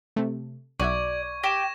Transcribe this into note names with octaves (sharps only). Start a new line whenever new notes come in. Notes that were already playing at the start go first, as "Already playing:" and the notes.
C3 A3
B1 F#4 D5 E5 C#6 G#6
G4 A#6 E7